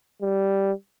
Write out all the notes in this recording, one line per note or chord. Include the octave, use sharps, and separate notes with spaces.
G3